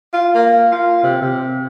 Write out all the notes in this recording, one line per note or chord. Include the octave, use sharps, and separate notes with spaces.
F4
A#3
F4
C3
C3